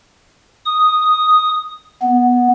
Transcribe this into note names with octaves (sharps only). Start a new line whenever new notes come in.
D#6
B3